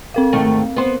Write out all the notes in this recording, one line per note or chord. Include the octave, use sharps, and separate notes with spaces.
C4 A#4 F5
G#2 D#3 A3
B3 C5